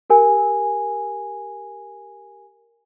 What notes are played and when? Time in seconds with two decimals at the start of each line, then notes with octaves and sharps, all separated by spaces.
0.10 G4 A#4 G#5